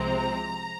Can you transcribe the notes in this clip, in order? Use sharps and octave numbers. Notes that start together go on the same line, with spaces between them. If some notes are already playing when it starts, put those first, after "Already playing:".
Already playing: C2 C3 F3 G#3 C4 A#5